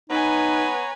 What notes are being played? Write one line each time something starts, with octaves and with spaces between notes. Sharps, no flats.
B3 D#4 B4 C#5 G#5 A#5